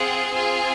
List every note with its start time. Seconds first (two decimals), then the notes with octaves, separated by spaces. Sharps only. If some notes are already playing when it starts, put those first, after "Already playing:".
Already playing: C4 F4 G#4 F#5
0.31 C4 F4 G#4 G#5